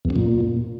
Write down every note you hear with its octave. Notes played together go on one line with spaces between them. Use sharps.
E2
F#2
A#2